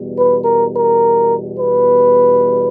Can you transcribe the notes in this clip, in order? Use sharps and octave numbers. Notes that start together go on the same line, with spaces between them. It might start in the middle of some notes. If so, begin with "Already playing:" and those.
Already playing: E2 B2 G3
B4
A#4
A#4
B4